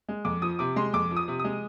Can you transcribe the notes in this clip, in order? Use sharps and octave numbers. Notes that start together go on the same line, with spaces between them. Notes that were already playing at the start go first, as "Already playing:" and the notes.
G#3
F2 D6
F3 D#6
C3 D6
G#3 C6
F2 D6
F3
D#6
C3
G#3 D#6